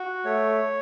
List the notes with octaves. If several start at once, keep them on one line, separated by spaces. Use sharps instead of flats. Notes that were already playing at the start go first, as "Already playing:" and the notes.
Already playing: F#4
A3 C#5